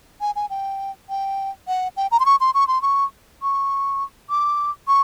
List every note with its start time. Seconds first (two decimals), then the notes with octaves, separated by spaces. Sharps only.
0.21 G#5
0.36 G#5
0.50 G5
1.09 G5
1.68 F#5
1.97 G5
2.11 A#5
2.20 C6
2.26 C#6
2.41 C6
2.54 C#6
2.68 C6
2.82 C#6
3.42 C#6
4.30 D6
4.88 C#6